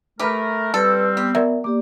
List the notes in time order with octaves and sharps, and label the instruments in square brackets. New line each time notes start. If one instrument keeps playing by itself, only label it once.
[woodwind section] A3 A#4 [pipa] G4 B4 [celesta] B5 D6
[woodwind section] G3 C4 [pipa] A4 [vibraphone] B4
[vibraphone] B3 [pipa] G4
[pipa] F#3 [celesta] A#4 D5 E5
[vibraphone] A#3 G4 D5 [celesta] D6